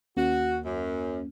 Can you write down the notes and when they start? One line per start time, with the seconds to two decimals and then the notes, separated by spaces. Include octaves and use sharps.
0.17 D#2 A#3 C#4 F#4
0.64 F#2